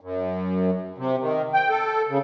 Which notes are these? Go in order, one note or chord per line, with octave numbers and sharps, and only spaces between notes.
F#2
C3
D#3
G5
A4
C#3